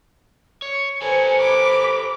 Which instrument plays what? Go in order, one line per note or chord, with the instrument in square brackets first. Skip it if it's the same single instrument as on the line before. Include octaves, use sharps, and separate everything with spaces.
[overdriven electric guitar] C#5 [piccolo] C#7
[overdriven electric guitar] A4 B4 [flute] C5 [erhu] G#5
[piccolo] B5 [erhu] D6